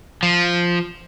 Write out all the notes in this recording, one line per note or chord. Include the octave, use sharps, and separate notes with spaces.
F3